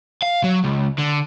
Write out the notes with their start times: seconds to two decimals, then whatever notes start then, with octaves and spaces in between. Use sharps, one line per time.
0.22 F5
0.44 F#3
0.64 C#2
0.98 D3